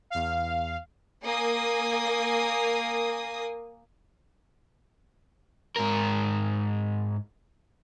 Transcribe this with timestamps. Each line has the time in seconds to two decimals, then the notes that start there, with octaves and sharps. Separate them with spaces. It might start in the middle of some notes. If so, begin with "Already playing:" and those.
0.10 E2 F5
1.23 A#3 G#5 D#6
5.77 G#2 A#4